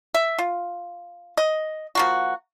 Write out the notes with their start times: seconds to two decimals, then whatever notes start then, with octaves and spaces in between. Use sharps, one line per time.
0.14 E5
0.38 F4
1.37 D#5
1.95 F3 A#3 F#4